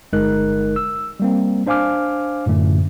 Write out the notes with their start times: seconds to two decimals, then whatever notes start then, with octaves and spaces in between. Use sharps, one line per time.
0.13 G1 G#3 D#4 A#4 F#6
0.76 E6
1.20 G3 A#3 C4
1.67 D4 C5 F5 G#5 D6 F6
2.46 F#2 A2 D3 A3